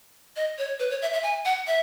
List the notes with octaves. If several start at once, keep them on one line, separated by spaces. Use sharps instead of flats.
D#5
C#5
B4
C#5
E5
E5
G#5
F#5
E5